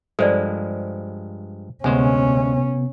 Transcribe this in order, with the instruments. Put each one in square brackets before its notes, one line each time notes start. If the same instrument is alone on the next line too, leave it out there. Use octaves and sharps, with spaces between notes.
[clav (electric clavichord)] G2 F3 G#3 [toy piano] A4 C5 D5
[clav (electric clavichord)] D2 G#3 C5 [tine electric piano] C3 B3 [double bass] C#4 [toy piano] G#5